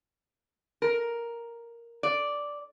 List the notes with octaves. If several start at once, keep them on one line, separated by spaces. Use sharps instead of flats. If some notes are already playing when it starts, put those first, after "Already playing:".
A#4
D5